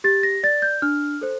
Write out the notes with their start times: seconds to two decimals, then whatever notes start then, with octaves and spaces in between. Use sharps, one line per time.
0.04 G4 A6
0.23 A#6
0.43 D5 A6
0.62 G6
0.82 D4 F6
1.21 A4 C5